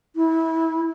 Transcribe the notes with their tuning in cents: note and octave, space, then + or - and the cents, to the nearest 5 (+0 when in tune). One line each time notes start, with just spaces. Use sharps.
E4 -25